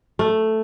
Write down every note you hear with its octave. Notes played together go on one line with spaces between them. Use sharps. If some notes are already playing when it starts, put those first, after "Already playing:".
A3